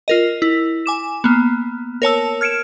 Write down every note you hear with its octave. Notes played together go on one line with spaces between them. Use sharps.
F4 A#4 D#5
E4
G#5 D6 E7
A#3 B3
A#4 C#5 A5 E6
F6 G#6 C#7 D7 E7